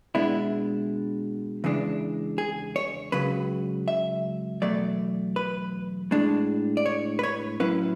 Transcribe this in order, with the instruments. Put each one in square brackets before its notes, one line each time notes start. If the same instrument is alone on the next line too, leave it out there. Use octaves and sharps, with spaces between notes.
[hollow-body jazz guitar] B2 G#3 B3 D4 E4
E2 C#3 E3 G#3 D4
G#4
C#5
C#2 C#3 F#3 B4
E5
E2 B2 F#3 A3 D5
B4
A2 G#3 D4
D5
C#5
B4
C#5
A2 F#3 C#4 E4 B4